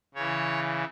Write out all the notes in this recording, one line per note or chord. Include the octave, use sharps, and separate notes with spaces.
C#3 E3 C#5